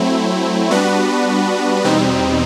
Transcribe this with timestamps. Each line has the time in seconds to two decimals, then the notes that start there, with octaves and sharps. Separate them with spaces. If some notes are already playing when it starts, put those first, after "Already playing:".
Already playing: F#3 A3 C4 E4
0.71 G3 B3 D4 F#4 B4
1.84 E2 B2 G3 C4 D#4